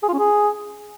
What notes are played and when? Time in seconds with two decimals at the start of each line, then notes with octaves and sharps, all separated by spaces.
0.03 G#4
0.08 F4
0.13 C#4
0.19 G#4